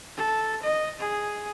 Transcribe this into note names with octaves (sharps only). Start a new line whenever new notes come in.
A4
D#5
G#4